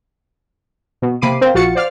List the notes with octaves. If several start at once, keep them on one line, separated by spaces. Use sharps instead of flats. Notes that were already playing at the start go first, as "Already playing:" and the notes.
B2
C3 A#3 B5 D6 C7 D#7
C4 A#4 C5 F5
A#1 F4 F#4 A6 C#7
C5 D5 F5 F6